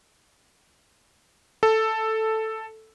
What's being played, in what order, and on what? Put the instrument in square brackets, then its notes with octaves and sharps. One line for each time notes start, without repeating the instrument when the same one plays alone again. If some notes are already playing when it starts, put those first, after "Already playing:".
[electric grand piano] A4